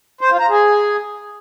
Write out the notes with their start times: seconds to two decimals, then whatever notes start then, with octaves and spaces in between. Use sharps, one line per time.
0.21 C5
0.30 F4
0.40 A#5
0.49 G#4